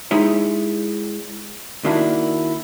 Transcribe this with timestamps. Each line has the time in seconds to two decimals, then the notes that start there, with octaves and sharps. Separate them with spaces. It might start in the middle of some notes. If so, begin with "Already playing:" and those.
0.11 G#3 D#4 E4 G4 C#5
1.84 D#3 A#3 D4 E4 F#4